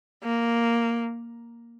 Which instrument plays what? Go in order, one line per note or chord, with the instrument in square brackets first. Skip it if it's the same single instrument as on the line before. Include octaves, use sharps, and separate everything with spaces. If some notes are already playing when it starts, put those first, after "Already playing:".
[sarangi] A#3